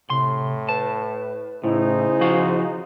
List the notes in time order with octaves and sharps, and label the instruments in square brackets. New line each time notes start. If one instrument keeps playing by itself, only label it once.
[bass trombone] A2 [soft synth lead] C3 [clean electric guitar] C6
[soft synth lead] B4 [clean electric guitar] A5
[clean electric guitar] A2 [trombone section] C#3 G#4 C5 [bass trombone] D#4 [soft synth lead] E4
[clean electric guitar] F3 F#4 F5